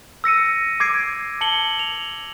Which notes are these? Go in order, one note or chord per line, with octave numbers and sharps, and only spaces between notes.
E6 A#6 C#7 D#7
D6 G#6 C7 D7
A5 C#7 F#7 G7
F7